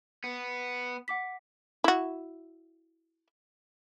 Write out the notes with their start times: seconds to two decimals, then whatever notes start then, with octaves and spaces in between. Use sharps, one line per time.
0.24 B3
1.08 F#5 D6 B6
1.84 E4 F#4